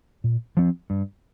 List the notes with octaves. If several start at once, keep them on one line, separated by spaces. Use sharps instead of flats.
A#2
F3 C4
G2